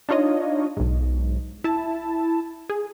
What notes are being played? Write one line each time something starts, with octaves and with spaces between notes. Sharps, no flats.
D4 D#4 F4 C#5 D#5
B1 G#2
E4 A5
G#4